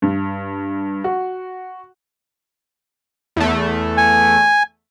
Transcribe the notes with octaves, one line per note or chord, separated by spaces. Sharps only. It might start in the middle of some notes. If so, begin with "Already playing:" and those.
G2
F#4
E2 A3
G#5